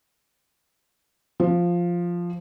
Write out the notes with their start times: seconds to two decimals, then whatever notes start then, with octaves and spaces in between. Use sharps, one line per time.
1.40 F3